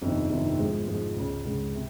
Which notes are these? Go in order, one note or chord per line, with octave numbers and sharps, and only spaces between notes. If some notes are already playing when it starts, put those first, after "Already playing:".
G1 F2 C3 D#3
G1 F2 C3 D#3
G#2 F3 G#3
G#2 F3 G#3
C#2 C#3 G#3
C#2 C#3 G#3
C3